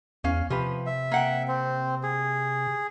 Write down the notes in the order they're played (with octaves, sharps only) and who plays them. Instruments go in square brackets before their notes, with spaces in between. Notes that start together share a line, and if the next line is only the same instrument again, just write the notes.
[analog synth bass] E2 [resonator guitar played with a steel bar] C#4 F5
[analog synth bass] C3 [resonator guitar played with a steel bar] F3 G4 B4
[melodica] E5
[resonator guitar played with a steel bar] A#3 F#5 G5
[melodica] C4
G#4